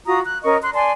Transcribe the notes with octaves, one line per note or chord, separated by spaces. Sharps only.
F4 F#4 A#5 D#6
F#6
C#4 A#4 D#5 C#6
C6 F#6
D5 G#5 A5 C6